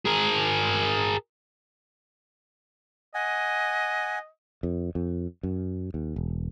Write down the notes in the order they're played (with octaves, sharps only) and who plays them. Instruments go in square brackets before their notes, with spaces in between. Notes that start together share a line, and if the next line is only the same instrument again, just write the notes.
[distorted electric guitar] G#4 A#4
[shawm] D#5 [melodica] F#5 G#5
[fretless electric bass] F2
F2
F#2
D#2
E1